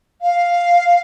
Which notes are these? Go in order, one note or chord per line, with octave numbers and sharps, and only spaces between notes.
F5